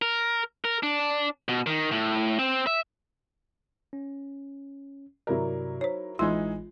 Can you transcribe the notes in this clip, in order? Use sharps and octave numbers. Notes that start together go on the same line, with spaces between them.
A#4
A#4
D4
B2
D#3
A2
C4
E5
C#4
G2 C3 F#3 E4 A#4 D5
D#4 C5 C#5
A1 E3 G#3 D#4 F4 C6